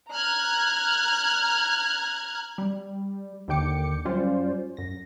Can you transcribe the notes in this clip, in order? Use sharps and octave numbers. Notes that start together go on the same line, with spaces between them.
A#5 F6 F#6 G#6
G3
D#2 D3 D#3 G5 D6 C#7
F#2 G3 C#4 F4 C5 D5
F#2 A#6